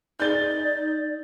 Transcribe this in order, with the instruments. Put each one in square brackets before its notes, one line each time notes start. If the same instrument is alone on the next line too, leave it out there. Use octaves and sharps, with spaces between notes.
[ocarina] D#4 [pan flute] D5 [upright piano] G6 A6 G7